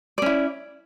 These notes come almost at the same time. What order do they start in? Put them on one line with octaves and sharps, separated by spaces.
D5 C#4 E4